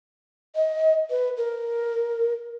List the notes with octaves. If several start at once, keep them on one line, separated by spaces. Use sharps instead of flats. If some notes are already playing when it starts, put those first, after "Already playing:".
D#5
B4
A#4